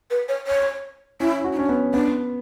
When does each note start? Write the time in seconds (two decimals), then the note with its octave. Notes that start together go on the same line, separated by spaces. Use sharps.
0.10 B4
0.29 C#5
0.47 C#5
1.20 C#4 E4
1.44 F#4
1.52 E4
1.57 C#4 D4
1.69 B3
1.94 B3 D4